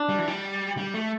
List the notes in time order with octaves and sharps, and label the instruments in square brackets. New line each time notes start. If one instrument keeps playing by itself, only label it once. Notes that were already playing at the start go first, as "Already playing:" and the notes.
Already playing: [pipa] D4
[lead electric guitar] G3
E3
G3
G3
A3